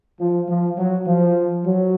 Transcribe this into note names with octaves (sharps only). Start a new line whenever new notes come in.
F3
F3
F#3
F3
F#3